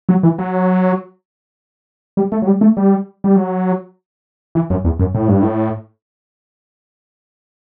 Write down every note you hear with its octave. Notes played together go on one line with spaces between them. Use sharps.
F#3
E3
F#3
G3
A3
F#3
G3
A3
G3
G3
F#3
E3
F#2
E2
F#2
A2
G2
A2